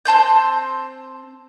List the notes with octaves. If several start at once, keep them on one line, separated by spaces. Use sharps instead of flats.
C4 A5 C6 G6